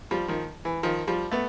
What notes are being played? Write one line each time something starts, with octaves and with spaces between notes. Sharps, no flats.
F3 G3
D#3 F3
E3
D#3 F3
F3 G3
A3 B3